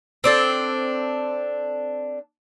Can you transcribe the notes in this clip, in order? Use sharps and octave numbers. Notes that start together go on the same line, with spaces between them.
C4 D4 A4